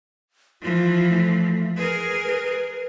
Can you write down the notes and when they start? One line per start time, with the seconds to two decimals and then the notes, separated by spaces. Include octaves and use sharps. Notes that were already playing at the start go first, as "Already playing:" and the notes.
0.62 E3 F3 F4
1.09 A3
1.77 G#4 A#4 B4